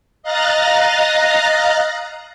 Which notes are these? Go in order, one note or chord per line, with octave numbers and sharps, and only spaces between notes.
D#5 F5 A#5 F#6 A6 A#6